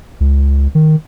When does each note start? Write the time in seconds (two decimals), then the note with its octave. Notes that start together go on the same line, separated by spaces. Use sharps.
0.20 C#2
0.75 D#3